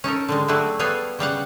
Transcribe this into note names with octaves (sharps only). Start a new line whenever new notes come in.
C#4 D#4 A4 A#4
D3 G3 G#3
F#3 G3 A3 E4 F#4 G#4
G3 B3 G#4 A4 F5 G#5
C#3 G3 F5 F#5